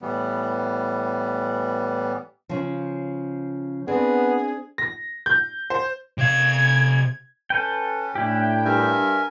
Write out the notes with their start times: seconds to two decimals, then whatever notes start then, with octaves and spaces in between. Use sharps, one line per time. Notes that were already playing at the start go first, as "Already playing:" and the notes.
0.01 A2 E3 G3 B3
2.49 C#3 F3
3.88 B3 C4 D4 G#4
4.78 A#6
5.26 G6
5.70 C5
6.18 C3 F5 G#6
7.50 C#4 A4 B4 G5
8.15 A2 D4 E4 G4 G5
8.65 G2 A#4 E5 G#5